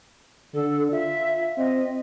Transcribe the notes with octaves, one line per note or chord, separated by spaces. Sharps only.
D3 A4
F4 E5
C4 D#5